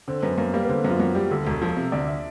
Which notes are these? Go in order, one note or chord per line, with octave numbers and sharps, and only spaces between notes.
D3 C4
F#2 B3
F#2 A#3
G3 A#3
B3
D3 C4
F#2
F4
F#2 F#4
G3 G4
D2 A4
E1
F3
C3
D2 D5
E5